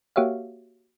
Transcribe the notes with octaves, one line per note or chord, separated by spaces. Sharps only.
A#3 F#4 G4 C#5 E5 F5